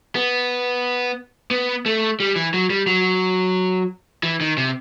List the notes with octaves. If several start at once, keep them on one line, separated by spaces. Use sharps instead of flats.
B3
B3
A3
G3
E3
F#3
G3
F#3
E3
D#3
C3